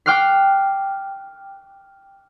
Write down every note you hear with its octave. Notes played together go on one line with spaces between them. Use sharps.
G5 D6 F6 F#6 C7